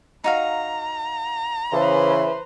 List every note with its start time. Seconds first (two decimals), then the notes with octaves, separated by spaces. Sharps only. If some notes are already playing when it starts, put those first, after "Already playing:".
0.24 D#4 F#4 F5 A#5
1.73 C#3 E3 B4 C5